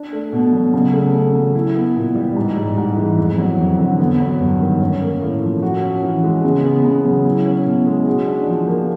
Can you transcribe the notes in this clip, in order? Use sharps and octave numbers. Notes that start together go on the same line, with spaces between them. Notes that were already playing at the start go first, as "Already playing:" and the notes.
Already playing: D4
A3
B2
F#3
C#3
A3
C#3
F#3
E4
B3
A#2
G3
G#2
G3
G#2
E3
F2
F#3
F2
D3
B3
F#3
G2
D#3
C#4
A#3
A2
F3
F#4
C#4
E3
G#3
C#3
B3
C#3
F#3
E4
C#4
B2
G#3
F#4
D4
F3
A#3